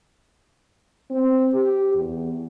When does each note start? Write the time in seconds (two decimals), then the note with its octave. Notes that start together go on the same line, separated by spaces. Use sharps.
1.11 C4
1.54 G4
1.95 E2